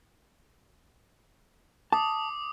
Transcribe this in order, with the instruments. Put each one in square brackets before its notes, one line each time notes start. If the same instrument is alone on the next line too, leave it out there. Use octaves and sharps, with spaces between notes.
[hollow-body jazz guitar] A5 [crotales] D6 D#6